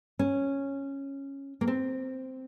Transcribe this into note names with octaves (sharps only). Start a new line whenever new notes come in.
C#4
A#3
C4